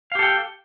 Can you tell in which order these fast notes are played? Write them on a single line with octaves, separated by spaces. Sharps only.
F5 G4 A4 G5